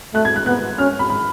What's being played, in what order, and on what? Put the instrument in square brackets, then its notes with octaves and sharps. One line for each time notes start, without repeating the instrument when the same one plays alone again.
[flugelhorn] A3 [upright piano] F#6
[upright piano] G#6
F#6
[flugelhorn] B3 [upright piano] F#6
[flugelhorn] C#4 [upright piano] F6
[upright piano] B5
B5